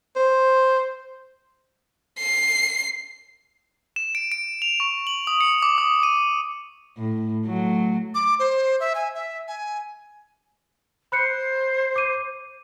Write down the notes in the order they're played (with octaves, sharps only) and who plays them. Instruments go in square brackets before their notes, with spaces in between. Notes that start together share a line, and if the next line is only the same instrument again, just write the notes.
[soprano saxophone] C5
[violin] C7
[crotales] E7
D7
D7
F7
C#6
F#7
D#6
C#7
D6
D#6
D#7
[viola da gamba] A2
F#3 A3
[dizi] D6
C5
E5
G#5
E5
G#5
[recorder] C5 [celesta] B5 F#6 C#7
[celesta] D6 D#7